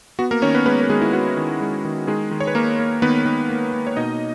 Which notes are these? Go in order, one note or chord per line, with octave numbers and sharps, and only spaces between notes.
B3 F#4
A#3 A#4
D#3 C#4 C#5
B3 B4
G#3 B3 B4
A#4
D#3 G#3 G#4
E4
B3 F#4
D#3
G#3
D#3
D#3 G#3 G#4
D#3
C#5
B4
A#3 A#4
A#3
D#3 B3 B4
D#3
A#3
A#3
C#5
B2 D#4 D#5